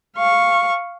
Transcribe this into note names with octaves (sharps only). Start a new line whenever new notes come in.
F5 C#6